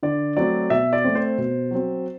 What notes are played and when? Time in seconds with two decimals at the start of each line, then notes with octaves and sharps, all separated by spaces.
0.03 D3 D5
0.37 F#3 A3 C4 D5
0.70 B2 E5
0.93 D5
1.04 A3 C4
1.15 C5
1.38 B2
1.71 F#3 C4